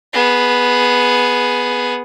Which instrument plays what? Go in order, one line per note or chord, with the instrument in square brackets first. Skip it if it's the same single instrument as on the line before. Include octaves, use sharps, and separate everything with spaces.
[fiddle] B3 G#4